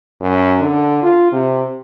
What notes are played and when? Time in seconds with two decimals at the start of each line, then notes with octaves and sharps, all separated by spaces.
0.21 F#2
0.60 D3
1.03 F4
1.33 C3